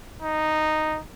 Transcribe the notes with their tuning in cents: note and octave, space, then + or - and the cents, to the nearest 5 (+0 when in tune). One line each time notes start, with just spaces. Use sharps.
D#4 -5